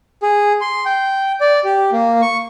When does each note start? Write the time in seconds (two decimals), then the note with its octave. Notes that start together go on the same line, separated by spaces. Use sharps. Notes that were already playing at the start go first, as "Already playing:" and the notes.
0.23 G#4
0.61 C6
0.86 G5
1.41 D5
1.64 G4
1.92 A#3
2.22 C#6